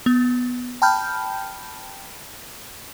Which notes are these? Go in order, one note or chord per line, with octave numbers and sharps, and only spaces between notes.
B3
G5 A5 B5 F6 G6